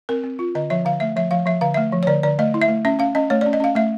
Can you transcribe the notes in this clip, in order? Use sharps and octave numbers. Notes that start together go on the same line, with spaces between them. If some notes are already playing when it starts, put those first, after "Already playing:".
C4 A#4
C4
F4
D3 D#5
F3 E5
D3 F5
A3 E5
F3 E5
F3 F5
F3 E5
D3 F5
E5
A3
F3
C#5
D3 D5
D3 D5
A3 D#5
E4
E5
A3
C#4 E5
C#4 F5
C#4 D#5
A3 C#5
D5
C#4
D#5
C#4 F5
A3 E5